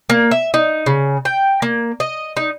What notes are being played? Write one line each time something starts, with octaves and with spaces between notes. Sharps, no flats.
A#3
E5
D#4
C#3
G5
A#3
D#5
D#4